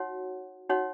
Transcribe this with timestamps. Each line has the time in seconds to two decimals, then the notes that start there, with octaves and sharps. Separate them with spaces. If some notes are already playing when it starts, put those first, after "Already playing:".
Already playing: D#4 F#4 C#5 F#5
0.70 D#4 F#4 C#5 F#5